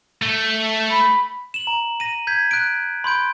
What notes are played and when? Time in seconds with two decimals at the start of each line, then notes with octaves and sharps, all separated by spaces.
0.22 A3
0.91 B5
1.54 E7 F#7
1.67 A#5
2.00 A#6 D#7
2.27 G6 G#6 B6
2.51 F#6 D7
3.04 B5 C6 G6 D7